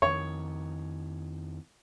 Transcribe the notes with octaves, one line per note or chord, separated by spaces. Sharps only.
F2 D#3 C#5